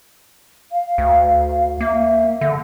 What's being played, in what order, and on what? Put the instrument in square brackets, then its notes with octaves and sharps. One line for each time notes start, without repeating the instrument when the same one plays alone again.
[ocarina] F5
[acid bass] D2
[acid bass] A#3 [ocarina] E5
[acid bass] D3